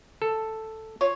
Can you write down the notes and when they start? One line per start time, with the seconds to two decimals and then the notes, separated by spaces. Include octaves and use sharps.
0.22 A4
1.01 F4 C#5